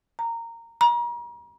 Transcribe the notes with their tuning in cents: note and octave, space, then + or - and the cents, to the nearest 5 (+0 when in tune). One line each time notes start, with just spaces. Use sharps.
A#5 -15
A#5 +40